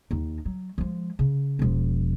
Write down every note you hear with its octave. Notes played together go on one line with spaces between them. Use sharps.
D#2 D#4
F#3
F3 G#3
C#3
E1 F3